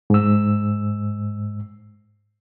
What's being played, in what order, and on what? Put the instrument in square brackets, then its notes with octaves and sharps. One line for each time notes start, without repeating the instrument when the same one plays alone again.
[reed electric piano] G#2 E6